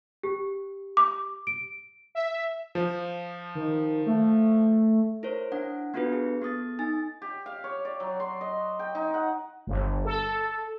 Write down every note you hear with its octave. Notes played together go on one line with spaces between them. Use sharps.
G4
D6
D7
E5
F3
D#3
A3
E4 A#4 C5 C#5
D4 E4 F#5
B3 D4 F4 F#4 A4 B4
G#4
B3 A4 D#6 A6
D#4 G#5 A6
G4
F5
C#5
D5
F#3
C6
D#5
G5
D#4
F#5
G1
A4